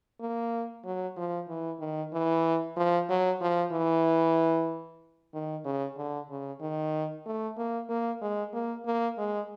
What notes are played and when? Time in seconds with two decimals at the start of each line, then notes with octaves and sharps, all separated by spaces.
0.20 A#3
0.84 F#3
1.17 F3
1.48 E3
1.80 D#3
2.13 E3
2.76 F3
3.09 F#3
3.41 F3
3.72 E3
5.34 D#3
5.65 C#3
5.97 D3
6.29 C#3
6.61 D#3
7.26 A3
7.58 A#3
7.89 A#3
8.21 G#3
8.53 A#3
8.86 A#3
9.18 G#3